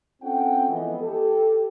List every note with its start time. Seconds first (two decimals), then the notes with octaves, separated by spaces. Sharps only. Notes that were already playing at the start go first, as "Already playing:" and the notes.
0.22 C4 C#4 F4 A4 F#5 G5
0.68 E3 F3 G#3 B3 A4 D#5
1.01 G4 A4